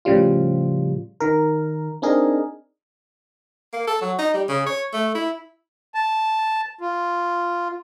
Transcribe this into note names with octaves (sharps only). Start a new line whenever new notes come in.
A2 C#3 F3 G3 F4
D#3 A#4
C4 D4 D#4 G#4 A#4
A#3
A4
F#3
D#4
G3
C#3
C#5
A3
E4
A5
F4